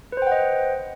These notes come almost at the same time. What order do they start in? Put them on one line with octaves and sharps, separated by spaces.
B4 C5 G5 F#5 D#5